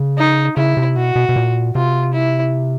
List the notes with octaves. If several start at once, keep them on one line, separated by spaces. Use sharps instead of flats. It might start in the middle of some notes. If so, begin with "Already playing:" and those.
Already playing: C#3
D#4
C#3 E4
C3
B2 F#4
B2
B2
A#2
C3 F4
E4